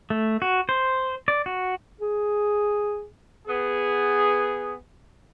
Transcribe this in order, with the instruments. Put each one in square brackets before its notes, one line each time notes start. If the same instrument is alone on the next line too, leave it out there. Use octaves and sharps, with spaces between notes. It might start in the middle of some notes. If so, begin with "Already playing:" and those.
[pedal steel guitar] A3
F#4
C5
D5
F#4
[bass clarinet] G#4
[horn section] B3 G#4